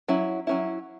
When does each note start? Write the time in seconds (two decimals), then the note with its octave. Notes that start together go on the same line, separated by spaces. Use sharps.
0.08 F#3 C#4 E4
0.47 F#3 C#4 E4